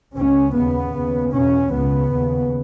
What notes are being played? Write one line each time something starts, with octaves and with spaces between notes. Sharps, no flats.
C#2 C#3 C#4
D#2 C#3 B3
D#2 C#3
E2 B2 C#4
C#2 C#3 B3
D#2 C#3